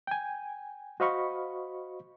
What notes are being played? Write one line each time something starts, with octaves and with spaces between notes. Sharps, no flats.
G5 G#5
F#4 C5 D#5 F5 B5 C#6